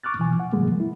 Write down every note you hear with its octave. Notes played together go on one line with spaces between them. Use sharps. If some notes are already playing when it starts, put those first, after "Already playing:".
C#6 D6 F6 F#6 A6
B2 E3 F3 G#5
F#5
G#2 C3 E3 F#3 G#3 A#3
F3
E4